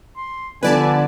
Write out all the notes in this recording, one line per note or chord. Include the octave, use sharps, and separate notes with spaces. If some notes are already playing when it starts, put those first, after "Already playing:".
C6
D3 F3 G3 B3 B4 D5 G#5 A5